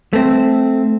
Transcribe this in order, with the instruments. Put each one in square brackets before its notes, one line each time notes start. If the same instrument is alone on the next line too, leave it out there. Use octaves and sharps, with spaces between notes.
[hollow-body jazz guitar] A3 C4